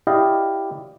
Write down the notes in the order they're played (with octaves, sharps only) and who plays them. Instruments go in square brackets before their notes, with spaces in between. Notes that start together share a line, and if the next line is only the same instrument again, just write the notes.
[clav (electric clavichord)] E4 G4 D5 D#5 F5